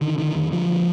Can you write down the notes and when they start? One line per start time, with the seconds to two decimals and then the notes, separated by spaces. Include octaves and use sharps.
0.01 D3 D#3
0.18 D3 D#3
0.35 F2 D#3
0.52 D3 F3
0.69 D3